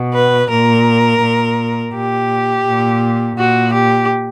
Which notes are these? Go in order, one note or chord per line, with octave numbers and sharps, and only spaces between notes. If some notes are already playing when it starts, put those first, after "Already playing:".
Already playing: B2
B4
A#2 A#4
A#2
A#2 G4
A#2
A#2 F#4
G4